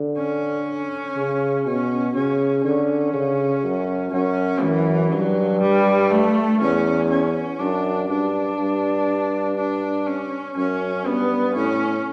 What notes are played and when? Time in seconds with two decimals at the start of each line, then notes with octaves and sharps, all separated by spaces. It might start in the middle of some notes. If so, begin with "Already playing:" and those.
Already playing: D3
0.17 C#4
1.16 C#3
1.66 B2 C#4
2.15 C#3 C#4
2.64 D3 C#4
3.14 C#3
3.64 F#2
4.13 F#2 C#4
4.62 F#2 E3
5.12 G2 F#3
5.62 G3
6.11 A3
6.61 E2 C#4
7.10 C#4
7.59 F#2 D4
8.09 G2 D4
8.59 G2
9.57 D4
10.06 C#4
10.57 F#2 C#4
11.06 G2 B3
11.55 A2 C#4